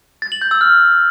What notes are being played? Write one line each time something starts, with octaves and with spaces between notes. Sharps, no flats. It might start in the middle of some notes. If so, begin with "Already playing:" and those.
A6
F#7
G6
E6
F6